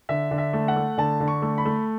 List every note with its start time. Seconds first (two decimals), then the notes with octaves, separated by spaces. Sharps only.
0.09 D3 E5
0.31 D3
0.38 E5
0.53 A3
0.68 F#5
0.76 A3
0.98 D3 A5
1.20 D3
1.28 C#6
1.42 A3
1.58 B5
1.65 A3